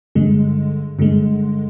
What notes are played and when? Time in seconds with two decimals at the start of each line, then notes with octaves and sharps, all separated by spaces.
0.15 G2 D3 G#3
0.99 G2 D3 G#3